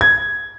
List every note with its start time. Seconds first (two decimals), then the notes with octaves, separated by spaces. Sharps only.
0.01 G#6